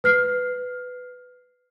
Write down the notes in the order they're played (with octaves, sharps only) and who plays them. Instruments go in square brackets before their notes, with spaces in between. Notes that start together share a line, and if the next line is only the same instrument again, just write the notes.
[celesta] B4 F6 C7